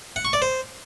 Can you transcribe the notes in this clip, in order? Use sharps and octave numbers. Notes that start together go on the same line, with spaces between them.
F#5
C#6
D5
C5